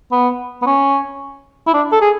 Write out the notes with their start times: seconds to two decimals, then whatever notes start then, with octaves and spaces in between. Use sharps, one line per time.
0.12 B3
0.62 B3
0.67 C#4
1.67 E4
1.74 D4
1.92 A4
2.01 G#4